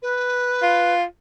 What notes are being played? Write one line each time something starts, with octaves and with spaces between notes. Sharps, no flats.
B4
F4